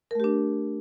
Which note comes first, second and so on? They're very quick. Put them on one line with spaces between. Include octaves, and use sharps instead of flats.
A#4 A3 G4 D4